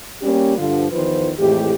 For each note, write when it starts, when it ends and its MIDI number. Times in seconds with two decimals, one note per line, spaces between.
0.22 0.56 55
0.22 0.56 58
0.22 0.56 61
0.22 0.56 67
0.57 0.86 43
0.57 0.86 50
0.57 0.86 53
0.91 1.30 40
0.91 1.30 51
0.91 1.30 53
0.91 1.30 65
0.91 1.30 71
0.91 1.30 72
1.38 1.73 41
1.38 1.73 45
1.38 1.73 52
1.38 1.73 56
1.38 1.73 67